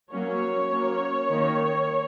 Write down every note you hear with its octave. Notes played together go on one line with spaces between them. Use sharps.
F#3 A#3 C#4 C#5
F#3 A#3 C#4
D#3 A#3 C#4